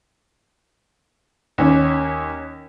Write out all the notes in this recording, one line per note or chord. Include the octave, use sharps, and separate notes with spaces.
D#2 C#4